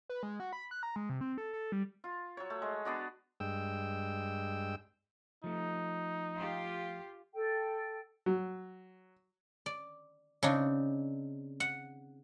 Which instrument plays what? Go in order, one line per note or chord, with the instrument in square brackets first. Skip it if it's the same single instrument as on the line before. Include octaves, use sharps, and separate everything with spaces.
[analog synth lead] B4
G#3
F#4
B5
F#6
A#5
G#3
C3
C4
A4
A4
G3
[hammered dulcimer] F4
F#3 C#5
A3
G#3
B3 D4 F#4
[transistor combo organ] G2 G#3 G5 E6
[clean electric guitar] F3 A3 [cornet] D#4
[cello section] F4 G4
[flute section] A4 G5
[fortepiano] F#3
[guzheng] D5
C#3 C4 D4 D#4
F#5